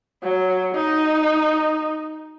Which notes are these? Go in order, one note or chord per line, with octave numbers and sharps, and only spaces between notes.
F#3
D#4